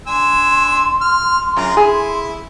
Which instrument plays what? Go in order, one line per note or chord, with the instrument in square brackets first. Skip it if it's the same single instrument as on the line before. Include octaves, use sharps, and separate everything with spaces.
[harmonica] D4 G#5 E6 [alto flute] C6
[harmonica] F6
[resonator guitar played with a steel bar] F#2 [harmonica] F4 G#4 A#5
[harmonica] E4 [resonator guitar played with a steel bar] G#4